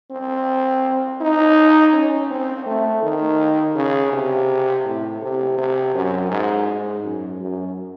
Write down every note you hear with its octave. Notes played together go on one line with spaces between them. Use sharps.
C4
D#4
C#4
C4
A3
D#3
C#3
C3
A2
C3
C3
F#2
G#2
G#2
F#2
F#2